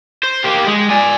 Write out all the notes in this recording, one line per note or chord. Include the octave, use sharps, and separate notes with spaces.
C5
A#3 G4
G#3
D5 G#5